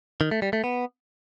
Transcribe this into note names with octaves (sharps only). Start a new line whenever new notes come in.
D#3
A3
G3
A3
B3